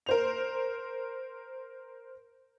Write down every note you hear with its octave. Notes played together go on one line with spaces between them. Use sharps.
A#4 C5 F7